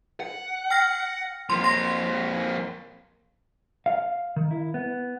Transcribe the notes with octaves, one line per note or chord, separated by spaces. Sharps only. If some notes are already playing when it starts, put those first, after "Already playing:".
F#5
G5 F6 A#6
F2 A#3 C6
C6 A#6
F5
D#3
E4
B3